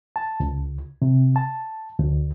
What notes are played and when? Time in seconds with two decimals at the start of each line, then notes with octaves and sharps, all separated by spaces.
0.16 A5
0.40 C#2
1.02 C3
1.36 A5
1.99 D2